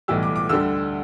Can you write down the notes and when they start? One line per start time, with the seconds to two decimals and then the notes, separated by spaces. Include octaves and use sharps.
0.08 B1 A2 E3 G3 E6
0.23 D6
0.36 D6
0.49 D2 D3 G3 E6